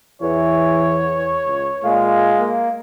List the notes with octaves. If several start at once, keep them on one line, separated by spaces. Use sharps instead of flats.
E2 E3 C#5
C#2
A#2 G#3 F5
A#3